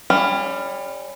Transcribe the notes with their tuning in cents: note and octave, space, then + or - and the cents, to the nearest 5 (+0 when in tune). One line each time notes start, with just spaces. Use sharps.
G3 +25 C#4 +0